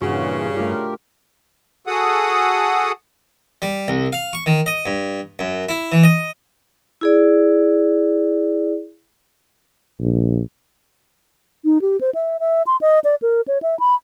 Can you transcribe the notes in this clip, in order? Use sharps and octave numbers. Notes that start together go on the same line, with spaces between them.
G2 A#2 C#3 E3 F#4
A3 D4 F4 G4 A#4
F#4 G#4 A4 F#5 D#6
G3
C2
F5
C#6
D#3
D#5
G2
F#2
E4
E3
D#5
E4 G#4 D5
A#1
D#4
G4
C5
E5
E5
C6
D#5
D5
A#4
C#5
E5
B5